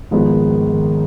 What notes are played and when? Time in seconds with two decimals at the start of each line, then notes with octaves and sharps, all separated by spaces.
0.11 G#1 G#2 D#3 F3 G#3 B3
0.70 D#3